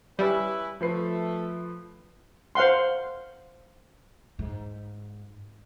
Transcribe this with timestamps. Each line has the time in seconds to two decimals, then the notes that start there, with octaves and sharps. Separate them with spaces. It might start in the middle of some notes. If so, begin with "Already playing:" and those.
0.19 G3 C#4 E4 B4
0.81 F3 A3 B4 C7
2.55 C5 F5 F#5 C6
4.39 G#2